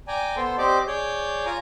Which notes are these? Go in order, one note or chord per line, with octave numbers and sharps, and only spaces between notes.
D5 G5 G#5 A#5
B3 A4 C5 C6
C4 G4 C5 D5 D#5 D6
G#4 C#5 D5 G6
F4 G#5 A#5